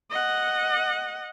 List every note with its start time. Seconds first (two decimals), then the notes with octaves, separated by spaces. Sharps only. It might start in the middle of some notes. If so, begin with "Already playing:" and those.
0.10 D#5 F#5